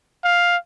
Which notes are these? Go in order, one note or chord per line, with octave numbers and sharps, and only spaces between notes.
F5